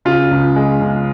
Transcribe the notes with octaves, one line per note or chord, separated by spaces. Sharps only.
C#3 F4
C#2
G#3
C#2